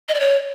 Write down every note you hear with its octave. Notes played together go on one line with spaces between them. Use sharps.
D#5
D5
C#5